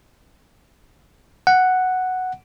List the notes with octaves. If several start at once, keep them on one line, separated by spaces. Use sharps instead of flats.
F#5